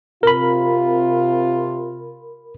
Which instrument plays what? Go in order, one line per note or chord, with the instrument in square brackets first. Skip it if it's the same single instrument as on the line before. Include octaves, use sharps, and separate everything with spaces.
[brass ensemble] C3 F4 [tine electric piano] A#4 B5